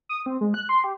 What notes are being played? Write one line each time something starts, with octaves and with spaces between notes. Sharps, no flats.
D#6
C4
G#3
F#6
C6
G4